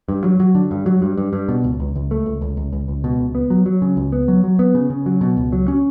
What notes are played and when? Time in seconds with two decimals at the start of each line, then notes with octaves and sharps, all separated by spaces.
0.08 G2
0.24 F#3
0.40 F#3
0.55 D3
0.71 G2
0.86 F#3
1.02 G2
1.17 G2
1.33 G2
1.49 B2
1.64 C#2
1.80 C#2
1.95 C#2
2.11 A3
2.26 C#2
2.41 C#2
2.57 C#2
2.73 C#2
2.88 C#2
3.04 B2
3.19 C#2
3.35 B3
3.50 F#3
3.66 F#3
3.82 C#3
3.97 C#2
4.12 B3
4.28 F#3
4.44 F#3
4.59 B3
4.75 C#3
4.90 C#3
5.06 F#3
5.21 B2
5.37 C#2
5.52 F#3
5.68 C#4